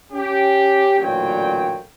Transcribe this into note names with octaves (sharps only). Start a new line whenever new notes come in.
C#4 G4
A1 A#2 D3 F#3 G5